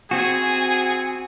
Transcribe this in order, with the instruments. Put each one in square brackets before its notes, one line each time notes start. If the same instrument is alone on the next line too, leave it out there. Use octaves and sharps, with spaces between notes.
[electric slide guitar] C4 F#4 [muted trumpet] G#4 [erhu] G#5